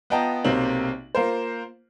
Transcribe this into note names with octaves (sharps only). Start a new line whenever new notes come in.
B3 F4 D#5 G5 A5 A#5
B1 C3 A#3 C4 F#7
A#3 F4 A#4 C5